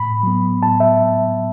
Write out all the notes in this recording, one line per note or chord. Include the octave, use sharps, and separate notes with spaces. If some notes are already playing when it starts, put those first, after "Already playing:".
Already playing: A2 B5
F#3 B3
A2 A5
E5